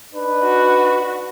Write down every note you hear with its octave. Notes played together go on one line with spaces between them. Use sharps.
D4 D#4 B4
F#4